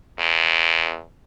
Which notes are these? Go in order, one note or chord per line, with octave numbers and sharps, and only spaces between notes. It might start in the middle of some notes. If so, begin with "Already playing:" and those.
E2